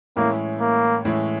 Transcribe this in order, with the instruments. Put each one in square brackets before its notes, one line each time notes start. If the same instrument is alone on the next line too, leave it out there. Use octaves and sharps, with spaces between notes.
[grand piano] A2 E3 G#3 C#4 E4 [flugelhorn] A#3
[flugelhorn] A#3
[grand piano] A2 E3 G#3 C#4 E4